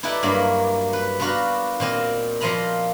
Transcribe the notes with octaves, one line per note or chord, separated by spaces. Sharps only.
D#4 E4 G4 A4 B4 D5
G2 F#3 A#3 B5
B4
B3 D4 F4 F#4 A#5 B5
A#2 C4 D#5
A#2 F3 F4 D#5 A#5 B5